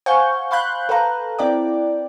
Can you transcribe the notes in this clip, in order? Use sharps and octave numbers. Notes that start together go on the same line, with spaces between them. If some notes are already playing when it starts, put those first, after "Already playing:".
C5 F5 F#5 G#5 C#6 G6
F5 B5 C6 F#6 G6
A4 B4 F5 A#5
C4 E4 D5 G5 D6